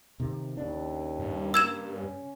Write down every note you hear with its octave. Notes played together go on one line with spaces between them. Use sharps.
C3 D#3
D#2 C#3 D4
G2
A#3 E6 G#6 E7
C#4